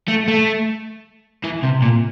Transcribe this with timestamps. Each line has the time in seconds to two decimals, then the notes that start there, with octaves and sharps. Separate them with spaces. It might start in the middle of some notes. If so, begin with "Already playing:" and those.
0.08 A3
0.28 A3
1.44 E3
1.63 C3
1.82 A#2